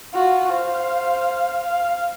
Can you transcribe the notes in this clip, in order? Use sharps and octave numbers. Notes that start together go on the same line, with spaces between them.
F4 F#4
C5 F5
F5